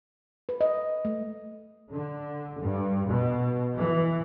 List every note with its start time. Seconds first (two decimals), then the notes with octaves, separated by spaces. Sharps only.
0.49 B4
0.61 D#5
1.05 A3
1.92 D3
2.59 G2
3.08 B2
3.77 E3